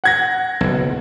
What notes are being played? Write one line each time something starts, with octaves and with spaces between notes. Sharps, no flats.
F#5 G#6 A#6
F#1 B1